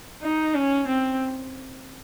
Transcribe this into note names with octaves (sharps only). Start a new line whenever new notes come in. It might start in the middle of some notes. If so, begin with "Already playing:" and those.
D#4
C#4
C4